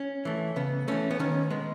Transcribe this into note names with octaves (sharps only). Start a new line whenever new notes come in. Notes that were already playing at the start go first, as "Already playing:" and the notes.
Already playing: C#4
E3 A3
C#3 B3
E3 A3 C#4
B3
D#3 C#4
G#3 B3